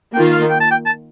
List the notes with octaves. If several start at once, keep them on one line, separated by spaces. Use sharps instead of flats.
D#3 A#3 F4 G5
F5
G5
A5
G5
A5